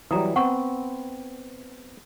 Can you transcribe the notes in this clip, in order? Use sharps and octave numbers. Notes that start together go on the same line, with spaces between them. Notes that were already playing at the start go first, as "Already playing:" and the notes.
E3 F#3 G3 A#5 D#6
B3 C4 F#5 C#6